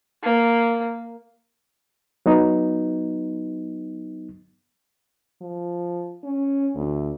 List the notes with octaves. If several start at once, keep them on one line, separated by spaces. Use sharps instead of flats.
A#3
F#3 B3 D#4
F3
C#4
D2